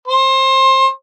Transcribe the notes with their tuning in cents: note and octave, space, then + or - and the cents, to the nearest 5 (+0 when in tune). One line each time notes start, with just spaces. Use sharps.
C5 +25